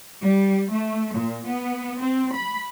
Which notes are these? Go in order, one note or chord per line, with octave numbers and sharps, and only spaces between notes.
G3
A3
A#2
B3
C4
B5